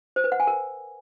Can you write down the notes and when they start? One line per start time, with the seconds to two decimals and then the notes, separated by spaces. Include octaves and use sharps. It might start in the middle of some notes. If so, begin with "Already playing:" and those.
0.16 C5
0.24 B4
0.32 F#5
0.40 G#5
0.47 A#4